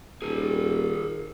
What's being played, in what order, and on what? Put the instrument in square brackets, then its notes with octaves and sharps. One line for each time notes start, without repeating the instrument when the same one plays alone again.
[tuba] D#1 [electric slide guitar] G#4 A#4